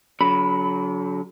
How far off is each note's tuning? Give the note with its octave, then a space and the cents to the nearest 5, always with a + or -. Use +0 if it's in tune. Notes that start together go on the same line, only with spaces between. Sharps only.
D3 -45 F#3 +0 B5 +0